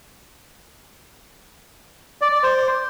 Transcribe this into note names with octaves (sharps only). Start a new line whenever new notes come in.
D5
D5
C5